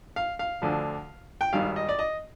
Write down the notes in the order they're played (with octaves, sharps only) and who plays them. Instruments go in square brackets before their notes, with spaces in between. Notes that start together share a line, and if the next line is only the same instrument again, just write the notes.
[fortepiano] F5
F5
D2 D3 F3
G5
G#1 G2 D#3 F5
D#5
D5
D#5